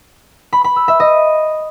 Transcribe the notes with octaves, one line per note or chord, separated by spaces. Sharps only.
B5
B5
E6
E5
D#5